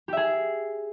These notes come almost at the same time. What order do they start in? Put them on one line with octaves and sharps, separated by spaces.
G4 E5 G#4